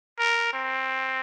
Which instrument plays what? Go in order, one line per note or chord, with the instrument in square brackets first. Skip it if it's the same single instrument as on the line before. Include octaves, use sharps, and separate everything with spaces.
[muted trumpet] A#4
C4